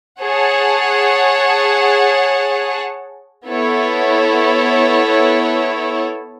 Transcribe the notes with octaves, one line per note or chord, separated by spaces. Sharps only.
G#4 C#5 F#5 A5
B3 E4 A4 C#5